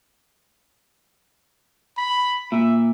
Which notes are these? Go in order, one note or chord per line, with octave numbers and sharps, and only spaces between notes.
B5
A#2 E5